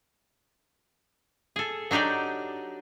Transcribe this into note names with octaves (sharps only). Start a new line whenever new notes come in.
G#4 A4
F#3 D4 D#4 G4 D5